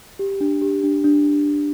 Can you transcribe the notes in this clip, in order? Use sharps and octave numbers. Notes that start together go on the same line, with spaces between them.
G4
D4
G4
D4
D4